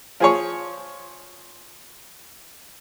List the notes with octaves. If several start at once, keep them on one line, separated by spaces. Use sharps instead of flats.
F3 G#4 C#5